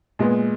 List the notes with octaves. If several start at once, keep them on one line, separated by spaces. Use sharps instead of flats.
A#2 G#3 B3